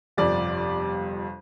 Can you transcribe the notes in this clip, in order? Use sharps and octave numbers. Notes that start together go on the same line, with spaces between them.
G1 F2 C3 G3 D5